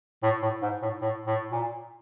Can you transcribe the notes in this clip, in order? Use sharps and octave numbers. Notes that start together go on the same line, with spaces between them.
A2
A2
G#2
A2
A2
A2
A#2